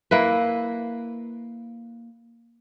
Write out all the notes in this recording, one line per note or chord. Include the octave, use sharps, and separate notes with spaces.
A#3 E4 B4